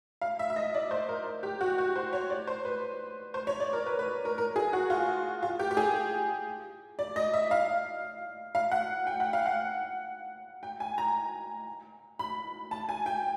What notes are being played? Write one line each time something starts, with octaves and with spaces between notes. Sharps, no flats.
F5
E5
E5
D#5
D5
C5
A#4
G4
F#4
F#4
C5
C#5
D5
C5
B4
C5
C#5
D5
A#4
B4
B4
A#4
A#4
G#4
F#4
F4
F4
G4
G4
G#4
D5
D#5
E5
F5
F5
F#5
G5
F#5
F5
F#5
G5
G#5
A#5
B5
A5
G#5
G5